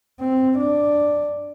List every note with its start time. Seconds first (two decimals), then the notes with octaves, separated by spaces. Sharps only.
0.20 C4
0.58 D4